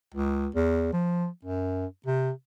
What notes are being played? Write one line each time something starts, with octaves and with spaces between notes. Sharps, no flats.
C#2
E2
F3
F#2
C3